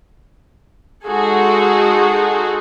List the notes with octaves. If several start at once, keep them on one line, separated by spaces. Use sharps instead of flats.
G#3 D#4 F#4 G#4 A4